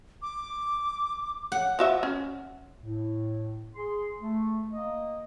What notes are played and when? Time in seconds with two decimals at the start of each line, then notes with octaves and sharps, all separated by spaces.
0.22 D6
1.52 F#5
1.79 F3 F#4 E5
2.03 C#4
2.82 A2
3.75 G#4 C6
4.20 A3
4.72 A#3 D#5